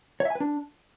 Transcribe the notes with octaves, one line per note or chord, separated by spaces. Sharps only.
C#5
E5
G#5
B4
D4